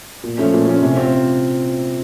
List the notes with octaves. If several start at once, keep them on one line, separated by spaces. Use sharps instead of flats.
A#2
F3 A3 C#4
A#2
F3 A3 C#4
C3
C4 F4